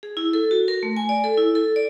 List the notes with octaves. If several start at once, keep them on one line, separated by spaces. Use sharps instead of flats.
G#4
E4
A4
F#4
A#4
A3
G#5
D5
A4
E4
A4
D5